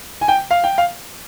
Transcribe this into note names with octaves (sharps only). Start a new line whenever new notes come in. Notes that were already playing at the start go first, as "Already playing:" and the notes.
G#5
G5
F5
G5
F5